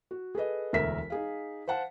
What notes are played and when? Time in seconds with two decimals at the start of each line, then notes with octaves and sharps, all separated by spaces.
0.11 F#4
0.35 G#4 A4 B4 D#5
0.73 E1 D2 A#4 E5 B6
1.10 D#4 G#4 F5
1.68 C5 F5 F#5 A5